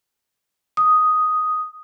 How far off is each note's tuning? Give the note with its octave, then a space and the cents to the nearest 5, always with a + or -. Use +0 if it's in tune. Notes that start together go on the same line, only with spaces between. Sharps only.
D#6 +5